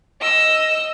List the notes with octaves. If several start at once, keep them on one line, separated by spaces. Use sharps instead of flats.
D#5 E6